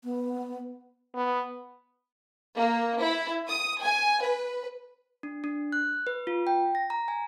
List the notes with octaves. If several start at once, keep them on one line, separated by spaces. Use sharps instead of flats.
B3
B3
A#3
E4
D#6
G#5
B4
D4
D4
F#6
B4
F4
G5
A#6
A#5
G#5